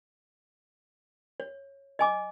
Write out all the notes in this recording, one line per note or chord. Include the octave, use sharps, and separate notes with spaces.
C#5
D#5 G#5 D6